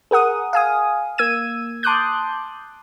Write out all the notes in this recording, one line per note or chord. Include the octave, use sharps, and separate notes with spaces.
G#4 A#4 F#5 D#6
F5 G#5 D#6
A#3 E6 G#6 D#7
A5 C6 D6 D#6 F#6 G6